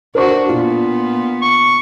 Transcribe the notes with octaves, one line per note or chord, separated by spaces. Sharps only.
D4 F#4 A#4 C5 C#6
A#2 B3 F4
C#6